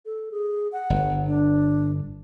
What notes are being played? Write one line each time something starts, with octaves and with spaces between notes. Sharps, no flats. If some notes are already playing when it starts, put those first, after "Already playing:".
A4
G#4
F#5
G1
D4